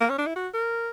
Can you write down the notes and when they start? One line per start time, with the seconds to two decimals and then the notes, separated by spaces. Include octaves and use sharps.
0.01 A#3
0.10 C#4
0.18 D4
0.27 E4
0.36 F#4
0.54 A#4